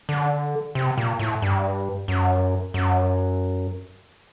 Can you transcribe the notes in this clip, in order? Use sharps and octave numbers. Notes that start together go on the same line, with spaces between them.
D3
C3
A#2
A2
G2
F#2
F#2